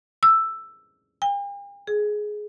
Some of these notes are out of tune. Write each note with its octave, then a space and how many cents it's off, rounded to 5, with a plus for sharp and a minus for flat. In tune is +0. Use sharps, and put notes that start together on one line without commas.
E6 +5
G5 +45
G#4 +15